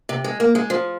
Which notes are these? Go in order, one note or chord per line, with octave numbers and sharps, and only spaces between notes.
C3
G#3
A#3
G#3
F3